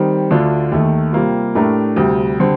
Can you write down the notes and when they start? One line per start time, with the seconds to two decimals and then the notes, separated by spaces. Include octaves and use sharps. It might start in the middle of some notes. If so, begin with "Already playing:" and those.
Already playing: D#3 G3 C4
0.31 D2 D3 A3 D4 F4
0.72 D#2 D#3 A3
1.13 C3 G3 A#3 F4
1.55 A2 A3 D4 G4 A#4
1.96 D2 C3 G3
2.40 D3 G3 C4